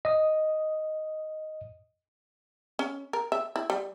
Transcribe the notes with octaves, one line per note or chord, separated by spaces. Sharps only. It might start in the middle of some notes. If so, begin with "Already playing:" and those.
D#5 D#6
C#4
A#4
E5
E4
G3